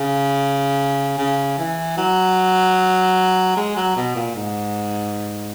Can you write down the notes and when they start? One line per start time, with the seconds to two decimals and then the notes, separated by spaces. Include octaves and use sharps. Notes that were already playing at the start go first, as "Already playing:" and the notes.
Already playing: C#3
1.18 C#3
1.58 E3
1.98 F#3
3.57 G#3
3.76 F#3
3.96 B2
4.16 A#2
4.35 G#2